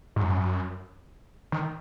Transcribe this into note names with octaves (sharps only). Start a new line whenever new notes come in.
G#2
F#2
D#3